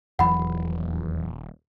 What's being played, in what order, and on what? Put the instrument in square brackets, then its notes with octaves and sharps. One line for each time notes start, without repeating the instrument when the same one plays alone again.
[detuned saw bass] D#1 [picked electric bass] E2 E3 F#3 [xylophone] F#5 B5